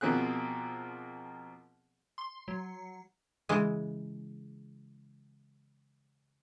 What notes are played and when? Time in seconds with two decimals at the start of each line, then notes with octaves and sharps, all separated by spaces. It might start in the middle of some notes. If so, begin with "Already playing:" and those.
0.01 B2 F3 A#3 C4 G#4 F#6
2.18 C6
2.48 F#3
3.49 C#3 E3 G#3